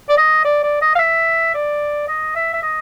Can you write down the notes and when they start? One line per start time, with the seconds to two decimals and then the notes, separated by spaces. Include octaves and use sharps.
0.09 D5
0.17 D#5
0.45 D5
0.63 D5
0.81 D#5
0.95 F5
0.99 E5
1.54 D5
2.08 D#5
2.35 E5
2.54 E5
2.63 D#5